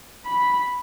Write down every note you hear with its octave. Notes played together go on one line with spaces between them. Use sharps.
B5